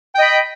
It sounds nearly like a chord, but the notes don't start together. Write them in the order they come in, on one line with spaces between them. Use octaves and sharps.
G5 D#5 B5